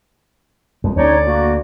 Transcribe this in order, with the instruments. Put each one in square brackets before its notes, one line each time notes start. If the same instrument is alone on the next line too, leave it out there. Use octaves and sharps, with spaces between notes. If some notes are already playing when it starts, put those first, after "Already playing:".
[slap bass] F2
[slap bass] D2 [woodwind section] C#4 D#4 C#5 [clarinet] D5
[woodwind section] A#3 F#4